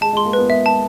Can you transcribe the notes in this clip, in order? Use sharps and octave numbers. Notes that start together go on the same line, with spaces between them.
G#3 A5
G#3 C6
A#3
B3 B4
B3 E5
A5